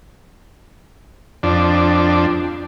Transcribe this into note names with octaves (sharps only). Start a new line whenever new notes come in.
F2 D4